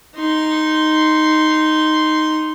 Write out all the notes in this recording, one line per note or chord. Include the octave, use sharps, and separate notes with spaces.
D#4 C6